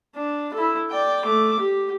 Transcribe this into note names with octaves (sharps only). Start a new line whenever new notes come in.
D4
E4 A4
D5 G5
A3 D6
G4